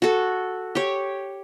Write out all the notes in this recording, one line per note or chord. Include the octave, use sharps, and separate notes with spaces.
F#4 A4
G4 C#5